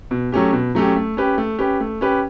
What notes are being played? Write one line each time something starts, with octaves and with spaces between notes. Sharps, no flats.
B2
F#3 A3 C#4 G4
B2
F#3 A3 C#4 G4
A3
C#4 G4 B4
A3
C#4 G4 B4
A3
C#4 G4 B4